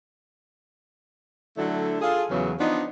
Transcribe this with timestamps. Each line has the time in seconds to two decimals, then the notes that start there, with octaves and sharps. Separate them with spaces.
1.57 D3 F#3 A3 D4 E4 A4
2.01 F4 G#4 A4
2.30 E2 C#3 E3 F#3
2.60 F3 B3 D4 D#4